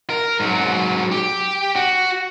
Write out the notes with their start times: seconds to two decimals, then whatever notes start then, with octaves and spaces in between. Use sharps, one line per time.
0.10 A#4
0.40 G#2 F#3
1.12 G4
1.76 F#4